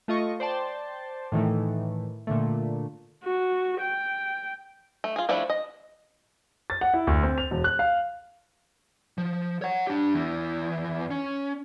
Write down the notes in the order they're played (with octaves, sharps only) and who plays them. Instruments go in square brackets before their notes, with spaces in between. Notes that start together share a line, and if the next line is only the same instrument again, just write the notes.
[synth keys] A3 F4 D#5 C#6
C5 D5 G5 A5 C6
A2 D#3 E3 A3
A#2 D3 A3
[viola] F#4
G5
[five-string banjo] A3
F4 G#4
F3 G3 A3 D4 E4
D#5
[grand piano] A6
F#5
E4
D2
C4
F7
E1
F#6
F5
[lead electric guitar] F3
C#5 F#5
D4 G4
E2 E3
C#4